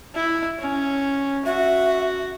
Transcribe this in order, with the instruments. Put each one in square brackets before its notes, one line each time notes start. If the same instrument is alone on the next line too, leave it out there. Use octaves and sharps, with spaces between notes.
[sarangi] E4
C#4
[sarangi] F#4 [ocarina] E5